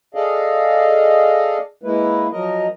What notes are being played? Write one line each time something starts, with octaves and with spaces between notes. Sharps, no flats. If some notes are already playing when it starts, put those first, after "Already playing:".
G#4 A4 D5 D#5 F5
G#3 A#3 E4 B4
F3 F#3 A#4 D#5